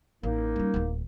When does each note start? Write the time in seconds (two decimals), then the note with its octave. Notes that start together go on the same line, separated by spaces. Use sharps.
0.23 A1 A#3 D#4
0.56 G3 C#4
0.74 D1 D#3